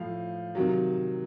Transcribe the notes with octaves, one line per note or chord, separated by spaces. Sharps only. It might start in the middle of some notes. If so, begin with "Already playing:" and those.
Already playing: A2 F3 F5
C3 D#3 F#3